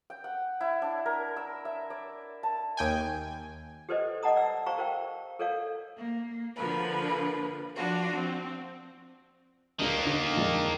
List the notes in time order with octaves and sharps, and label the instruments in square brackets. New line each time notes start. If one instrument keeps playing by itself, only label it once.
[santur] G5
F#5
E4
D4
A#4
E6
E5
D5
A5
[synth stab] D#2 G5 G#5
[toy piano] G4 A4 B4 C5 D5 D#5
D5 D#5 F#5 A5 A#5 D#6
D5 E6
G4 C5 F5 A#5 C#6
A#4 C5 F5 G5
A4 A#4 C#5 D5 F5
[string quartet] A#3
D3 F3 A#3 B4
F3 D4 F4 F#4
C4
[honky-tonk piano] C#2 D4 [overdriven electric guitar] D#3 A#3
[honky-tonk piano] D3 D6
F2 G#3 D5